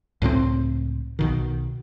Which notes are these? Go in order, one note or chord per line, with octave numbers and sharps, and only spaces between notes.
C#2 A2 G3 C4
B1 B2 D#3